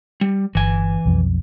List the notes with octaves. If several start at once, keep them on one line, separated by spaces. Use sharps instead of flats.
G3
G1 E3 G#5
B1 F2